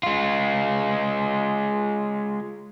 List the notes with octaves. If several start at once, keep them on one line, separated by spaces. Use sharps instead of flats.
G#3 F4